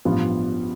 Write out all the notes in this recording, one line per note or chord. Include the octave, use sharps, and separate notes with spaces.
A1 G2 F3 B3 F4